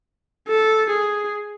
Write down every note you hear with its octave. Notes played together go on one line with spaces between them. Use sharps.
A4
G#4